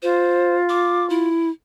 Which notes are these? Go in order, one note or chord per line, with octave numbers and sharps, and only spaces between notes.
F4 C5
D6
E4